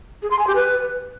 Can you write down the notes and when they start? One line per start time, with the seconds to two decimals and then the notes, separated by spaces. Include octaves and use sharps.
0.22 G#4
0.31 C6
0.39 G#5
0.47 G4
0.55 B4